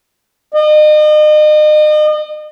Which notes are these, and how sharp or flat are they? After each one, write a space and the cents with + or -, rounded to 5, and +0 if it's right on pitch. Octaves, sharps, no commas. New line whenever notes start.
D#5 -35